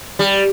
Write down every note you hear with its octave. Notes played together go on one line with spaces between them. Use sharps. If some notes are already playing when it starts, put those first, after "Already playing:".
G3